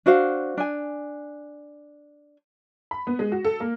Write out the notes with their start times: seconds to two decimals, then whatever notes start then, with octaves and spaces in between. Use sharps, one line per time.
0.06 D4 F#4 C5 F5
0.58 D4 G#5
2.91 B5
3.07 B3
3.19 G#3
3.32 F#4
3.45 A4
3.60 A#3